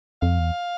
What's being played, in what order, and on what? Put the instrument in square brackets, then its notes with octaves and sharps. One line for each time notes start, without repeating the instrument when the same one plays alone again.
[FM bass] F2 [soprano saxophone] F5
[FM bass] E2